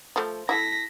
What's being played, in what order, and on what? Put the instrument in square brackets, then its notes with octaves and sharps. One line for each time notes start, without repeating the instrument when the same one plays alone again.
[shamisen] F3 A3
[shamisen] E4 F#4 A4 [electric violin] A#6 B6